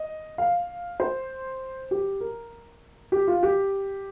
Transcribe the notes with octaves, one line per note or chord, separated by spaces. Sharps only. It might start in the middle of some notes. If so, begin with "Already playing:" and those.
Already playing: D#5
F5
C5
G4
A#4
G4
F4
G4